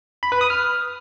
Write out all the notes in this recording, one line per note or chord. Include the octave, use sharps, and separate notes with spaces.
B5
B4
D#6
F6